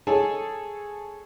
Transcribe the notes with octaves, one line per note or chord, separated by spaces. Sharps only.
G#4 A4 C#5 G#5 A5